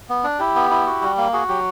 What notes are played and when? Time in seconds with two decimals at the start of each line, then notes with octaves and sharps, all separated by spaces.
0.09 B3
0.24 D4
0.39 E4 G4
0.56 B3
0.70 E4
0.86 F#4
1.02 G3
1.17 A#3
1.33 F#4 G#4
1.49 F#3 G4